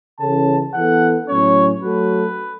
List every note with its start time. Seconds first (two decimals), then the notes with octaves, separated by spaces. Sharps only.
0.19 C#3 E3 C#4 A4 A5
0.74 E3 B3 A4 F#5
1.28 A2 F#3 C#4 C#5
1.81 F#3 A3 F#4 A4 B4